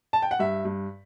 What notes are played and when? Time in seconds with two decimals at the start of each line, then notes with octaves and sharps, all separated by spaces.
0.13 A5
0.22 G5
0.31 F#5
0.39 G2 E5
0.65 G2